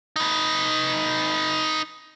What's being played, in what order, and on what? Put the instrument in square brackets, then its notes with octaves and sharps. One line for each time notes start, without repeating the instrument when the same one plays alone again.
[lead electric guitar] D#4 B4